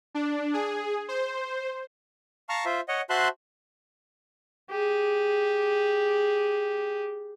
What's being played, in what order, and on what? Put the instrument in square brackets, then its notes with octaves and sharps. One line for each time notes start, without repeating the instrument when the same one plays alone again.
[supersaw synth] D4
G#4
C5
[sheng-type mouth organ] F5 A5 A#5 C#6 F6
F4 C5 E5
C#5 D#5 F#5
F#4 C5 E5 A5 C6 F#6
[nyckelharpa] G4 G#4